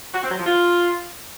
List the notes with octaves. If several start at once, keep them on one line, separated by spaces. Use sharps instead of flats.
F#4
C4
F#3
F3
F4